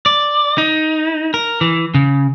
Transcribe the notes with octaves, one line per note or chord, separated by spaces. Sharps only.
D5
D#4
A#4
E3
C#3